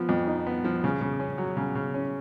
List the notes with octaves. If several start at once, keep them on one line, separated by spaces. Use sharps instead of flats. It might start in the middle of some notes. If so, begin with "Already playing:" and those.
Already playing: F3 B3
F2
D#4
B3
F3
C#3
C#3
C#4
F#3
C#3
C#3
C#4